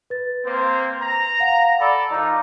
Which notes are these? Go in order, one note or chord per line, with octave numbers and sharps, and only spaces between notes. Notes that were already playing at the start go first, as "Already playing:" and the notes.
B4 A6
A#3 C4 C5
A#5
F5 F#5
A4 D5 B5 E6
F3 D#4 F4 A#5 D6